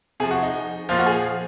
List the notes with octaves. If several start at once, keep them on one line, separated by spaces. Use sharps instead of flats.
C3 F3 G#4
F#4
D#4
A#2 F3 F4
F#4
G#4